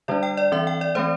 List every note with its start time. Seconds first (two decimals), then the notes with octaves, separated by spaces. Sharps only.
0.08 D3 G3 D4 D5
0.23 G5
0.37 D5
0.52 E3 C4 E5
0.67 G5
0.81 D5
0.95 E3 A3 C4 C5